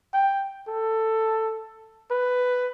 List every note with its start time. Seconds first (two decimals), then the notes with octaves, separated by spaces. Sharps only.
0.13 G5
0.68 A4
2.11 B4